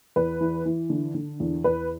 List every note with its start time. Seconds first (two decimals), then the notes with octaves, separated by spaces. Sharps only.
0.16 E2 B4
0.41 E3
0.65 E3
0.90 D3
1.15 D3
1.40 E2
1.64 E2 B4